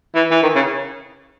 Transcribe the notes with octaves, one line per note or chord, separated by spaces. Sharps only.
E3
E3
D#3
C#3